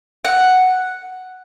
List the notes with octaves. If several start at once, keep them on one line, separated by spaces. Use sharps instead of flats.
F#5